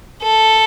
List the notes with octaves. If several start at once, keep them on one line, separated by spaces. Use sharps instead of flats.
A4